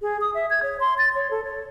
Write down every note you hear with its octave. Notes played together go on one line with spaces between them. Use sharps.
G#4
D#6
E5
G#6
C#5
C6
A6
C#5
A4
C#5